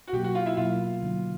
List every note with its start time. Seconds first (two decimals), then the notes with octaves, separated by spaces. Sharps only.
0.07 F#4
0.13 B2 F#3 A#3 G4
0.24 F#4
0.35 F4
0.46 E4
0.57 B2 F#3 A#3 F4
1.02 D3 F#3 A#3 D#4